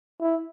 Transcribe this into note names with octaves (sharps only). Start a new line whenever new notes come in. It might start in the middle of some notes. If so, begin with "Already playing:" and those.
E4